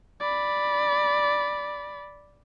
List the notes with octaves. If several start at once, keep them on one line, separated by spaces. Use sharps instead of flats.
D5 B5